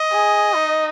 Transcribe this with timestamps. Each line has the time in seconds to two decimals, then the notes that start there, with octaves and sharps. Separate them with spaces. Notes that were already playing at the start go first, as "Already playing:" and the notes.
Already playing: D#5
0.12 G#4
0.56 D#4